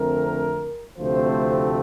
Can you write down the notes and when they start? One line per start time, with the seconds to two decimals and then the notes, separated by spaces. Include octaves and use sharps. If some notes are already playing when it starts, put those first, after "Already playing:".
Already playing: F2 D3 A3 C4 A#4
0.98 D2 C3 F3 A3 C4 C5